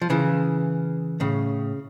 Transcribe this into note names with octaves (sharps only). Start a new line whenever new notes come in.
F3
C#3 E3
A2 C#3